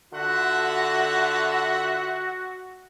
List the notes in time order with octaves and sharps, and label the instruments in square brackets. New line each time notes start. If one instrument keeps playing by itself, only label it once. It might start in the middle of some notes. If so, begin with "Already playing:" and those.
[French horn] D3 [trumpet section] F4 E5 F#5 [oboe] F#4